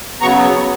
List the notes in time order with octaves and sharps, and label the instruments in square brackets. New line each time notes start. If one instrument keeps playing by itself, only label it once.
[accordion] C#3 F#3 B3 A#5 C#6